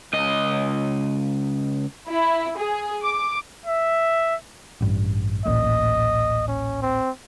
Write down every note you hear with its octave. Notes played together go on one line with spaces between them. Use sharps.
C#2 D#5
E4
G#4
D6
E5
A1 G2
D1 A1 A#2 D#5
C#4
C4